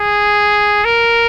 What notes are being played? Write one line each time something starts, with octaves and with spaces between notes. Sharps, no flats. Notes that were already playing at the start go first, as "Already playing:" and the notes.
Already playing: G#4
A#4